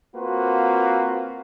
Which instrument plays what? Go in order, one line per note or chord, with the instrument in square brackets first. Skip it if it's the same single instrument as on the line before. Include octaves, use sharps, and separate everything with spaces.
[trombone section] A#3 C4 F4 F#4 B4 C5